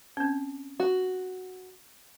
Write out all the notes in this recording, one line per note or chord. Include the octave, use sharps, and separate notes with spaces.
C4 C#4
F#4